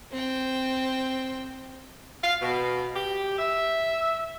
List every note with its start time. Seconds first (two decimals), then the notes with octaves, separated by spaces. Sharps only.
0.11 C4 G5
2.24 F5
2.42 B2
2.96 G4
3.39 E5